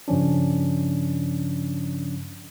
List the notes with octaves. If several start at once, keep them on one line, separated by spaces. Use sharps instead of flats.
G2 C#3 F3 C#4 D4